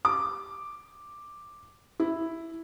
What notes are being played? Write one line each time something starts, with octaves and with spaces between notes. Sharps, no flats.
D6
E4